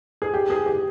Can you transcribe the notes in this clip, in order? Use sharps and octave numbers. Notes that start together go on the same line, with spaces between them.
G#4
G4
G#4
G4